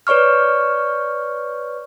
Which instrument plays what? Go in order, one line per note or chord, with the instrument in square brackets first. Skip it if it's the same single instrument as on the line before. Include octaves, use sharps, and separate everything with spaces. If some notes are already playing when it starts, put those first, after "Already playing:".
[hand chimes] B4 C#5 D5 C#6 F6